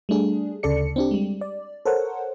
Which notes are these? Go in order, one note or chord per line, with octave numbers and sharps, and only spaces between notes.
G3 A3 D4 G#4
D2 C#3 A4 D5 C#7
C4 D4 G4
G3 G#3
D5
A4 A#4 C5 C#5 F#5